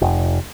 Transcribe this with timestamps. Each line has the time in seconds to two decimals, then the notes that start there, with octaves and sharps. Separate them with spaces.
0.01 F1